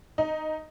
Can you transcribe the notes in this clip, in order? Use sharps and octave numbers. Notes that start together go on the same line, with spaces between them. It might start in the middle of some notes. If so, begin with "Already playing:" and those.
D#4